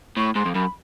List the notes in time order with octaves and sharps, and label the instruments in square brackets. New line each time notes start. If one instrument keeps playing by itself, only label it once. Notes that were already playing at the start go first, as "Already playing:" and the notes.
[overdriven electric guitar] A2 [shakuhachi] C#6
[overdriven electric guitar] G#2 [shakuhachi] C6
[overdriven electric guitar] F2
[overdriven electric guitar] F#2 [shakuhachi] B5